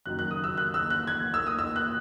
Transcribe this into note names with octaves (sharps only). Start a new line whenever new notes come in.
F#1 F#2 D#3 F#3 F#6
F#6
D#6
E6
F#6
E6
F#6
G#6
E6
D#6
E6
F#6